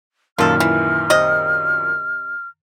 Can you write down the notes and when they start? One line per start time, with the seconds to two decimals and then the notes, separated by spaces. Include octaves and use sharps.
0.38 F#2 A#2 D#3 F4 A4 F6
0.60 E3
1.10 C3 D#5